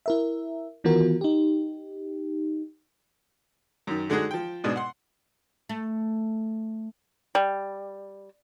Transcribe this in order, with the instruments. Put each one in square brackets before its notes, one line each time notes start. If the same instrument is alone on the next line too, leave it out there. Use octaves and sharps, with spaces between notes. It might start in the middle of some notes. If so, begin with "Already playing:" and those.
[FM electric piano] E4 A#4 E5
D#3 E3 B3 F4 F#4 A#4
D#4 G4
[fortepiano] F#2 D#3
D3 G#3 D#4 F#4 G#4
F3 G5
G#2 B2 G#3 D4
F#5 C6
[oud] A3
[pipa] G3